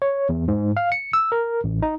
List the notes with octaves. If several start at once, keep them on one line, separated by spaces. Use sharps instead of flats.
C#5
E2
G#2
F5
C#7
E6
A#4
A1
D#4